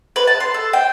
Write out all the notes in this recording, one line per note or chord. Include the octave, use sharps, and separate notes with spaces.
B4
A5
C6
A4
G5